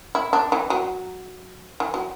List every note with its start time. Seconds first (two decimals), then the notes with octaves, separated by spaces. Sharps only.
0.15 E4
0.33 D4
0.52 E3
0.70 F#3
1.80 E3
1.94 F#3